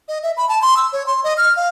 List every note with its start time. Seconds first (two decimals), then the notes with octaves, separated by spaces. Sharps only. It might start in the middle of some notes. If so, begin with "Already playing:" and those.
0.08 D#5
0.23 E5
0.37 B5
0.49 A5
0.62 C6
0.77 E6
0.92 C#5
1.06 C6
1.24 D#5
1.37 F6
1.56 F5